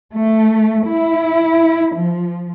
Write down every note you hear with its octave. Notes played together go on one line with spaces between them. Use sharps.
A3
E4
F3